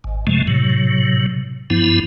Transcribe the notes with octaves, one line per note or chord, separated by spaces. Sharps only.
G#1
F#2 C3 F3 G#3 A3
A2 C3 F#3
G2 F3 B3 E4